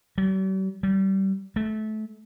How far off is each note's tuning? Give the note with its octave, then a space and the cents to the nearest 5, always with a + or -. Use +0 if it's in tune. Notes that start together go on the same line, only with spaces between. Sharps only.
G3 -45
G3 -25
A3 -25